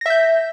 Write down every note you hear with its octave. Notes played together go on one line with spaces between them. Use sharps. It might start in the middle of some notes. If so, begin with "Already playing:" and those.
E5 G6 A#6